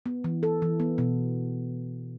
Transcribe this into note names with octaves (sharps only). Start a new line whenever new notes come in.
B3
E3
A4
E3
B3
B2